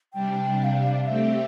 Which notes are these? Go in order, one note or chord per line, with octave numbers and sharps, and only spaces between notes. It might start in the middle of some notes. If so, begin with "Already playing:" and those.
C3 G3 D4 G5
G5
F5
A3 C4 G4 E5